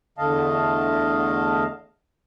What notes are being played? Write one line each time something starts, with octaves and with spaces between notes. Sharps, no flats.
E2 D3 A3 D#5 F5 A5